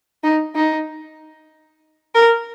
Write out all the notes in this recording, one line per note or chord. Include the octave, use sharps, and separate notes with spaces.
D#4
D#4
A#4